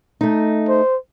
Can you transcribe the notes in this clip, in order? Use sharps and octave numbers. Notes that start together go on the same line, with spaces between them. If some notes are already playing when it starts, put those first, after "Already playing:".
A3 D#4
C5